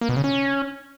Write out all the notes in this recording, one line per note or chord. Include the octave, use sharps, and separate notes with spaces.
A#3
B2
C#3
C#4